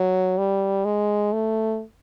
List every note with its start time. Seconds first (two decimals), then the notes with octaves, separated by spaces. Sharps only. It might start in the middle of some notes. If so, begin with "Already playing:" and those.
Already playing: F#3
0.38 G3
0.85 G#3
1.33 A3